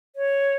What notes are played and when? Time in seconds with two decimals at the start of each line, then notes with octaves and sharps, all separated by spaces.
0.16 C#5